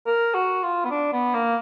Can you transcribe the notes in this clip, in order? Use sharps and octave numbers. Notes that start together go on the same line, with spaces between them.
A#4
F#4
F4
B3
D4
B3
A#3